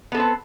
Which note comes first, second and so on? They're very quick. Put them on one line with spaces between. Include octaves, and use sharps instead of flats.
B3 A4 C4 B4